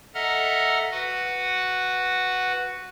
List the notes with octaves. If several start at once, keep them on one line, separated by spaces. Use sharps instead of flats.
A4 D#5 E5 F#5 A#5 F6
F#4 B4 F#5